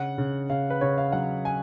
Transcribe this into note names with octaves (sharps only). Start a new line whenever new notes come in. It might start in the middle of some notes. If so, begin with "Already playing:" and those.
Already playing: C#3 F#5
C#3
C#3 F5
B4
C#3 C#5
F5
F#3 F#5
G#5